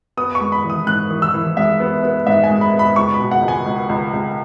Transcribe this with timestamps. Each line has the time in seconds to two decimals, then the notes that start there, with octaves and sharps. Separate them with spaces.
0.17 B3 D#6
0.35 C#6
0.41 G#3
0.52 B5
0.64 E3
0.70 D#6
0.87 G#2 F#6
1.11 E3
1.22 E6
1.34 E3
1.57 G#3 E5
1.80 B3
2.03 B3
2.27 G#2 E5
2.44 G#5
2.50 G#3
2.61 B5
2.73 B3
2.79 B5
2.96 C#2 C#6
3.14 B5
3.19 B2
3.31 F#5
3.42 C#2
3.48 G#5
3.66 C#2
3.89 C#2
4.13 C#2